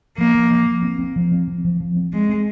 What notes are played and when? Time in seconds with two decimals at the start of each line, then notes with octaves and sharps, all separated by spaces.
0.18 F3 A#3
0.35 F3
0.51 F3
0.67 F3
0.83 C4
0.99 C4
1.16 F3
1.32 C4
1.48 F3
1.65 F3
1.80 F3
1.97 C4
2.13 G#3 C4
2.29 C4